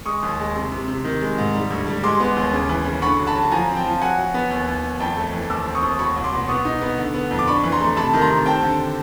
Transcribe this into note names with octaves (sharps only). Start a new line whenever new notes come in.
G#3 C#6 D#6
D#2
G#3
C3
C3
C3
D#3
G#3
G#2
G3
D2
G3
G#3 C6 D6
B3
D#2
C#3
E3
C#3
D3 B5 C#6
F#3
A5 B5
F#3
F3 G#5 A#5
C4
G5 A5
F3
F#3 F#5 G#5
F#3
B3
D#2
D#2
D#2
F2 G5 A5
A3
E3
D#2 D6 E6
C4
C#6 D#6
D#2
F#3 B5 C#6
C2
C6 D6
B2
B3 C#6 D#6
D#4
B3
D3
B3
F2
D6
D4 B5 C#6
E3
A#5 C6
A3
C3 A5 B5
D#3
A#5 C6
C3
C4 G5 A5
D3